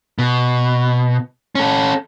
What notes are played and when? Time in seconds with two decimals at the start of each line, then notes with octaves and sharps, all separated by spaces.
0.18 B2
1.55 C#4 A4